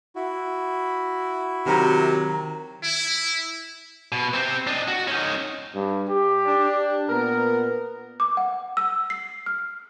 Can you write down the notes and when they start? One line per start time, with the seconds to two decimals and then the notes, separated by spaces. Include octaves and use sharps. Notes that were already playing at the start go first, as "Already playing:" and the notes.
0.15 E4 F#4
1.66 C3 D#3 F#3 A#4 A#5
2.83 E4
4.12 B2
4.34 C3 C4
4.67 D4 D#5
4.88 F#4
5.08 C#4 D#4
5.75 G2
6.08 G4
6.46 D4
7.09 A#2 B3 A#4
8.20 D6
8.37 F#5
8.77 E6
9.10 C7
9.46 F6